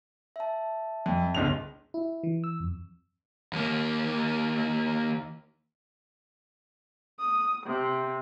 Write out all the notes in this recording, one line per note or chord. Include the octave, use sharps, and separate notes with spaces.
E5 A5
F2
G1 C#2 F7
E4
E3
E6
F2
D#2 A#3
D#6
C3